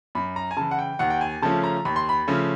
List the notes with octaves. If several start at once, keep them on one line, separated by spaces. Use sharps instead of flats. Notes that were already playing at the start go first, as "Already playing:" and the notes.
F#2 B5
A#5
G#5
C#3 E3 A5
F#5
G5
D#2 F#5
G5
G#5
C#3 F3 A3 C#4 A5
A#5
D#2 B5
C6
B5
C#3 F3 A3 C#4